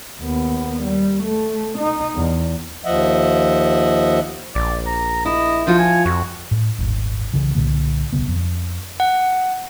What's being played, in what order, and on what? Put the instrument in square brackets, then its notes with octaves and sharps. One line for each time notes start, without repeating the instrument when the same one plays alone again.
[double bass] D#2 B3
G3
A3
D#4
E2
[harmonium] D#2 F3 D#5 E5 F#5
[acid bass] A#1 [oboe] D5
[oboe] A#5
[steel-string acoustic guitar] E4 [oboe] D#5
[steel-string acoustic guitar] F3 F4 F#4 [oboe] C5
[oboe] G#5
[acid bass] F2 [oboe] F#4
[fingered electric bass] A2
D#1 G#1
C2 C#3 E3
C2 A#2 D3 A#3
D#1 B1 C#3 B3
F2
[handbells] F#5